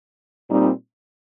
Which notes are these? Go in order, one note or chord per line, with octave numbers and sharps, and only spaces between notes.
A#2 G3 C4 D#4